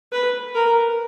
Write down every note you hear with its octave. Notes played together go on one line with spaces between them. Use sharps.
B4
A#4